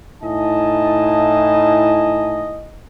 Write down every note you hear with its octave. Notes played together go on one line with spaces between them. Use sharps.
A2 D#4 E4 D#5 G#5 A5